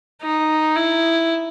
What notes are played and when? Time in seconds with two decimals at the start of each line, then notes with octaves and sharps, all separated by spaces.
0.22 D#4
0.76 E4